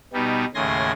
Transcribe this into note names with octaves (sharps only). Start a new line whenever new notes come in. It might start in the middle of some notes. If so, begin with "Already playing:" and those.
B2 G3 B3 D#4
D#2 A2 C#3 G#5 C6 A#6